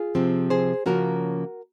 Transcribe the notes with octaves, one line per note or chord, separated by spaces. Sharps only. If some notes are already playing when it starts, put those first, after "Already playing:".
Already playing: F4 G#4
C3 F3 C4
G#4 C5
C#3 F3 A#3 C#4 F#4 A#4